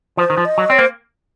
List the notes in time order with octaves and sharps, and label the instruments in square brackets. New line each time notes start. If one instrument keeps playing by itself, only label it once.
[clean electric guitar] F3 [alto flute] C5
[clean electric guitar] D#3
F3
[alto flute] D#5
[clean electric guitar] F#3
[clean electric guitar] C4 [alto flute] C#5
[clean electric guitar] A#3 [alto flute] C5